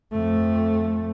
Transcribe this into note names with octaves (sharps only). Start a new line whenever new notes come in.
F2 A3